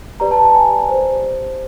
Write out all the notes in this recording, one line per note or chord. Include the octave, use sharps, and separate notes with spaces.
G4 B4 D5 A#5
A5
A5
G#5
G4 C5